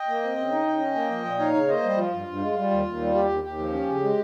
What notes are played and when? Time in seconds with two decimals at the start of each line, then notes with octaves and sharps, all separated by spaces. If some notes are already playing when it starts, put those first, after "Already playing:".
Already playing: D#5 G5
0.08 A#3
0.23 C4
0.37 C#3
0.51 D#4
0.66 C#3
0.80 C#4
0.95 A#3
1.10 F3
1.25 A#2
1.39 D#4 C#5 F5
1.55 C#3
1.68 A#3 C5 D#5
1.83 G3
1.98 F3 F4
2.13 G2
2.27 G2
2.41 G#3
2.57 G3
2.71 D#2
2.86 D#2
3.01 G3
3.15 D#2 G4
3.29 D#2
3.44 D#2 G4
3.59 F3
3.73 C#4
3.88 C#3
4.03 G#3